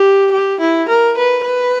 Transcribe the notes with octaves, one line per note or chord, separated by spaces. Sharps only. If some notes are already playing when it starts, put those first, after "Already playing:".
Already playing: G4
G4
E4
A#4
B4
B4